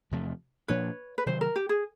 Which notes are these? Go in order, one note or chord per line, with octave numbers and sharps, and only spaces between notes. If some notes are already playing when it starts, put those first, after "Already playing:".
E2 C3 F3 A3
A#2 F3 A#3 D4 B4 C#5
B4
C3 D#3 F#3 C5
A#4
G4
G#4